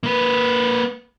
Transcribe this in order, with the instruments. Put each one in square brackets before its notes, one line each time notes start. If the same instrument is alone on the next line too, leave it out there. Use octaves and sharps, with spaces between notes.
[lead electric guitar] A#3 B4